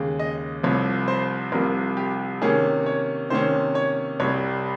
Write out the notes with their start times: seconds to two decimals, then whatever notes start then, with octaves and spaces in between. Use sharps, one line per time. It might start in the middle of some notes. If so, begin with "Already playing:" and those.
Already playing: D#2 C#3 G#3
0.19 D#5
0.63 C2 C3 F3 C#5
1.08 C5
1.52 C2 C3 F3 A#4
1.97 G4
2.41 C3 D#3 A#3 C#4 G#4
2.86 C#5
3.30 C3 D#3 A#3 C#4 C5
3.75 C#5
4.20 C2 C3 G3 C#5